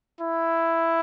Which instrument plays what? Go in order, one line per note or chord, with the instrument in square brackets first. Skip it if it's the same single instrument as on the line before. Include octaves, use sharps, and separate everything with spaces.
[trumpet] E4